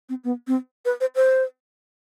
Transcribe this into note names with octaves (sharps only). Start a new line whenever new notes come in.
C4
B3
C4
B4
C5
C5